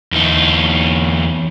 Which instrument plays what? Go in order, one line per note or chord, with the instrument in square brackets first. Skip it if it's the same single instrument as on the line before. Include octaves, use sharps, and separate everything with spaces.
[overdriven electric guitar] E2 D#4